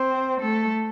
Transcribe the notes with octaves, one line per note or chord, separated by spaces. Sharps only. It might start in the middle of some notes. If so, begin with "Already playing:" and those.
Already playing: C4 C5
A3 A4